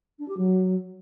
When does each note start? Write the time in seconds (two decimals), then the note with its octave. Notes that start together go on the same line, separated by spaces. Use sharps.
0.19 D4
0.28 G4
0.37 F#3